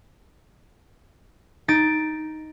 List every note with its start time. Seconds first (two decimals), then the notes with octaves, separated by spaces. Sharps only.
1.68 D#4 A6 D7